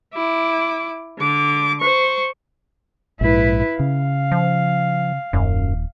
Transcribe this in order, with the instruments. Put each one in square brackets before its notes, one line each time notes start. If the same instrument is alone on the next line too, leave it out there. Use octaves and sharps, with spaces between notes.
[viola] E4 D6
D3 D6
C5 C#6
[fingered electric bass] A#1 G#2 [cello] E4 B4
[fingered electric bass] C#3 [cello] F5
[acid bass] F3
[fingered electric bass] D#1 [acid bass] F#2